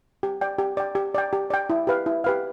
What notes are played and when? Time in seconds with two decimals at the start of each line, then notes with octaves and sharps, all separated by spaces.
0.23 G4
0.41 D5 G5
0.59 G4
0.77 D5 G5
0.95 G4
1.15 D5 G5
1.33 G4
1.50 D5 G5
1.70 E4
1.87 G4 B4 F5
2.06 E4
2.24 G4 B4 F5